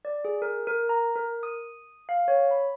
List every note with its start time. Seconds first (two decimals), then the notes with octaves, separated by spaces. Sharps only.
0.05 D5
0.25 G#4
0.42 A#4
0.67 A#4
0.89 A#5
1.16 A#4
1.43 D#6
2.09 F5
2.28 C#5
2.51 B5